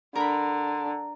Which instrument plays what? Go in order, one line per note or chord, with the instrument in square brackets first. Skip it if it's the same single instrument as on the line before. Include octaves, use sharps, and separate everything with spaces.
[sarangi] D3 [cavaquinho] A#4 A#5 B5